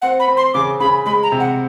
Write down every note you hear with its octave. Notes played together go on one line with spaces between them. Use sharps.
C4 F#5
B5
C4
C6
C#3 D6
C#3 B5
G#3 B5
A#5
C3
F#5